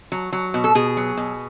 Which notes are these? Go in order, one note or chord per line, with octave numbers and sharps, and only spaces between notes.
F#3
F#3
B2
A4
B2 G#4
F#3
B2